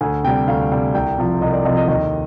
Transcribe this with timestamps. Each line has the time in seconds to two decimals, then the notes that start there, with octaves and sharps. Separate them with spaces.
0.01 D2 G#5
0.24 C3 G3 G5
0.47 D2 F5
0.71 C3 G3
0.95 C2 G5
1.18 C3 F3
1.41 C2 D#5
1.53 D5
1.65 C3 F3 D#5
1.77 D#5
1.88 D#2 D#5